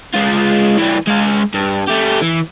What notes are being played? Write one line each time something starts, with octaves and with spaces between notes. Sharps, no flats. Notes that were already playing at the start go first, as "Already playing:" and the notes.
G#3 F4
E3 G3
G#3 F5
G2
A3 G4
E3